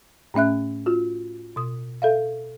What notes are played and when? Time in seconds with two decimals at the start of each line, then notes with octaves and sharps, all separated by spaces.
0.34 A2 A3 C#4 E5 F#6
0.86 F4 F#4
1.56 B2 D#6
2.02 A4 E5 F5